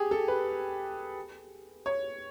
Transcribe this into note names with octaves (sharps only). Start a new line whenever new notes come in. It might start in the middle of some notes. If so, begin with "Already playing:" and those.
Already playing: G4 G#4
A4
B4
C#5